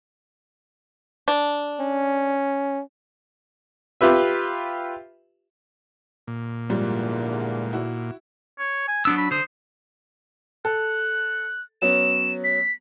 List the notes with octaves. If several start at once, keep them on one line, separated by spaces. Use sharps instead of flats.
D4
C#4
F4 G4 B4 E5
A#2
E2 G#2 D3 F3 G3 A#3
E4 F#4
C#5
G#5
F#3 B3 D4 E6
B5
D3 C5 D#6
A4 F#6
F#3 B3 C#4 E7
B6